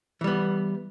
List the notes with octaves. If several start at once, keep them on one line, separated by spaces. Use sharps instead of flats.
E3 G3 B3